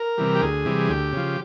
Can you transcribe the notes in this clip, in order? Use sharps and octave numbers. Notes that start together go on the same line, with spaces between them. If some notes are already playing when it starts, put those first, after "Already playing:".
Already playing: A#4
C3 E3 G3
G4
D2 G#4
C3 E3 G3
D2 G4
C#3 F3